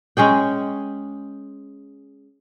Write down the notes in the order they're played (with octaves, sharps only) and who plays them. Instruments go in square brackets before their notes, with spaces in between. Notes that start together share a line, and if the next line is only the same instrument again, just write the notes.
[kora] G#3 C#4 G#4 G5